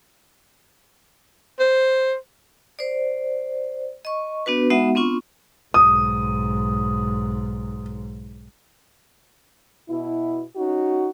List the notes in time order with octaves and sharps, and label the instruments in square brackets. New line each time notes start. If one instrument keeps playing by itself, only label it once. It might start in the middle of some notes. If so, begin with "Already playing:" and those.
[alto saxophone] C5
[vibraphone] C5 D5
D#5 C#6
B3 D4 F#4 B4
G#3 B3 D#4 F#4 E5 F#5
B3 C4 D4 F4 C#6
[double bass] B1 G#2 [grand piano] D#6
[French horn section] B2 E4
C#4 D#4 F#4